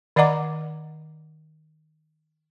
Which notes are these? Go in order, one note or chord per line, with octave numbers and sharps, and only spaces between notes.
D#3 D5 D#5 F#5 A#5 D6